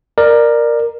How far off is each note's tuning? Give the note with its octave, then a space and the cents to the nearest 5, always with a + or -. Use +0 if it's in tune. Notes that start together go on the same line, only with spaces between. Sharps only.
A#4 +0 D5 +20